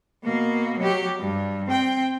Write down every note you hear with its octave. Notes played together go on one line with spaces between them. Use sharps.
B2 A#3
F#3 G4
G2
C4 G5